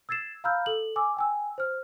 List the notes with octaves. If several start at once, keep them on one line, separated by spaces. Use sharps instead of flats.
E6 G#6 A6 C7 E7
F5 A#5 B5 E6 F6 G6
A4 F#7
G#5 D6 E6
G5 G#5 E6
C5 F6